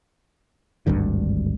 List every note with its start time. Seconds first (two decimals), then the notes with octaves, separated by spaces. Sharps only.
0.87 G#1 D2 G2 D3